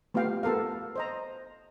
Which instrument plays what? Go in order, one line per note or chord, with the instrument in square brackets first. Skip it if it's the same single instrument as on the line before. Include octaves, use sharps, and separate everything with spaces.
[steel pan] A3 B3 F4 G4 F5 G5
B3 A4 A#4 F5
C5 D#5 A#5